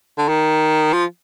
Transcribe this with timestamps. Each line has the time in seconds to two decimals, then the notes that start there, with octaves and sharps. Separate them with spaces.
0.18 D3
0.28 D#3
0.93 F3